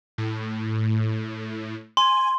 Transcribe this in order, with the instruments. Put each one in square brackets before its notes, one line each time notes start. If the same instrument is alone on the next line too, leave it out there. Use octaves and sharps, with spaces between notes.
[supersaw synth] A2
[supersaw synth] G#5 [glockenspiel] C6